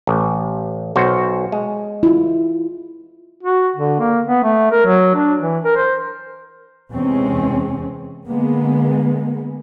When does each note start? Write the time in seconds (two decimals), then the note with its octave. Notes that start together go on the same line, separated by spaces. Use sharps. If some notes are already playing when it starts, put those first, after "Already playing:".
0.07 A1
0.96 B1 F#4 C5
1.52 G#3
2.03 E4 F4
3.43 F#4
3.76 D3
4.00 A#3
4.26 B3
4.44 A3
4.72 A#4
4.85 F#3
5.15 D4
5.40 E3
5.64 A#4
5.76 C5
6.92 E2 C3 G#3 C4 C#4
8.28 D3 G#3 A#3 B3